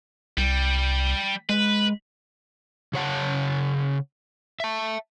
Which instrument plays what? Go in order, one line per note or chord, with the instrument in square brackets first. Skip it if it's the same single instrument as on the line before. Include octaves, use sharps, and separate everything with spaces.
[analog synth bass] C2 [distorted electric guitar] G3
[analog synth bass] G#3 [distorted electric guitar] B4
[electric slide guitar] C#3 C#5 F#5 A5
E5 A5